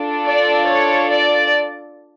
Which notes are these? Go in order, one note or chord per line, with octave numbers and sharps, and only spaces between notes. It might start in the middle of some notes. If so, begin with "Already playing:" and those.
Already playing: D4 F4 A4
D5
C#5
D5